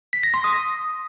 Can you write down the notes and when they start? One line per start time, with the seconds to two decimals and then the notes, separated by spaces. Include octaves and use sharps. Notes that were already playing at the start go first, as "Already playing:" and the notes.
0.13 B6
0.23 A#6
0.34 C6
0.44 D#6